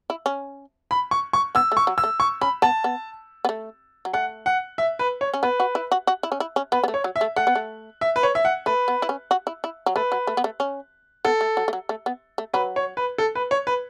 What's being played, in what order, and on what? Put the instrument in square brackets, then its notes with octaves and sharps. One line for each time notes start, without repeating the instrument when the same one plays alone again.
[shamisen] E4
C#4
[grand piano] B5
C#6
C#6
[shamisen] B3 [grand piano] E6
[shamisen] A3
[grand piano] C#6
[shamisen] F#3
[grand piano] E6
[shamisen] A3
[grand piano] C#6
[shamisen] C#4 [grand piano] B5
[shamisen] B3 [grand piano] A5
[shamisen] B3
B3
A3
F#3
[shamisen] A3 [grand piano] F#5
[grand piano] F#5
E5
B4
C#5
[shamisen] C#4
[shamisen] B3 [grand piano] B4
[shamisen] F#4
E4
F#4
F#4
E4
C#4
E4
C#4
[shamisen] B3 [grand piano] B4
[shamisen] B3
A3
[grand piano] C#5
[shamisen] F#3
[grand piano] E5
[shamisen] A3
[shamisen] A3 [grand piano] F#5
[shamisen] B3
A3
[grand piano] E5
B4
C#5
E5
F#5
[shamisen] A3 [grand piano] B4
[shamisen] B3
E4
C#4
F#4
E4
E4
F#3
[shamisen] A3 [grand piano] B4
[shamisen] F#3
A3
B3
A3
C#4
[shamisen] B3 [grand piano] A4
[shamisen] A3
F#3
A3
F#3
A3
B3
A3
[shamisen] F#3 [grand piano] B4
[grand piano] C#5
B4
A4
B4
C#5
B4